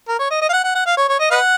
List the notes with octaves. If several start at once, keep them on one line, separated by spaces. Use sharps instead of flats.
A#4
C#5
D#5
D#5
F5
F#5
F#5
F#5
F5
C#5
C#5
D#5
B4 D#5 F#5